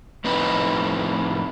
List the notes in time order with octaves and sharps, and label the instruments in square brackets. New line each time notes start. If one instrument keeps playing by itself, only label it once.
[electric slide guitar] F2 A2 C4 D#4 B4